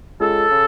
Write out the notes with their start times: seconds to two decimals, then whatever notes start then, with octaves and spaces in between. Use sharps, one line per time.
0.20 C#2 A4
0.51 C#3